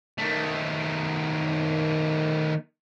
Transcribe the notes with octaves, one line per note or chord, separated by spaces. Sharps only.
D#3 A3